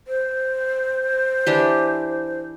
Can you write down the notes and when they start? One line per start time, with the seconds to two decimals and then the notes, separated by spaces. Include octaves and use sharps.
0.07 C5
1.47 E3 D4 G4